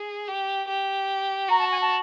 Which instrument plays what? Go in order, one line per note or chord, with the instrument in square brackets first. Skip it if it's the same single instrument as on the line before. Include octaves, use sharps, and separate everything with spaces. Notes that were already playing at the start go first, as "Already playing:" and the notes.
Already playing: [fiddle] G#4
G4
G4
[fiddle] F#4 [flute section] A#5
[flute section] A5
G#5
A5